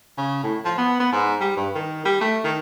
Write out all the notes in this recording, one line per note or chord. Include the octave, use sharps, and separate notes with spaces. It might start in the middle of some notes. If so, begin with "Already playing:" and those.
C#3
A2
F3
B3
B3
G#2
G3
G2
D#3
G3
A3
D#3